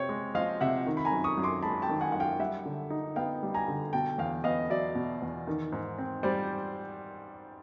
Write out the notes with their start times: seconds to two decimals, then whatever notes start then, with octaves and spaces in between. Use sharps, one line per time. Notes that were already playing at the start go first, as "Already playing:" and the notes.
Already playing: C3 C4 C#5
0.09 G#3
0.35 F3 D#5 F5
0.61 C3 E5 F#5
0.87 D#3
0.97 B5
1.05 G#5 A#5
1.12 F#2
1.24 C#6 D#6
1.38 F#2
1.43 C6 D6
1.62 G#3 A5 B5
1.82 G5 A5
1.89 D#3
2.01 F#5 G#5
2.12 F#2 F#5
2.20 F5 G5
2.39 G3 E5 F#5
2.66 D3
2.90 D#4
3.16 B3 F5 G5
3.43 G3
3.54 G#5 A#5
3.68 D3
3.93 B2 G5 A5
4.18 E2 F5 G5
4.44 B3 D#5 F5
4.70 F#3 D5 E5
4.95 B2
5.22 E2
5.47 D#3
5.72 G#2
5.98 C4
6.23 G3 C5 D5